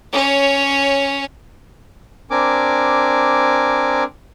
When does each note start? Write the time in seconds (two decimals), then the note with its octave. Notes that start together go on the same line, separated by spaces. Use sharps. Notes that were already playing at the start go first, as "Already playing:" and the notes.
0.12 C#4 C#5
2.31 C4 D4 A#4 G#5 D6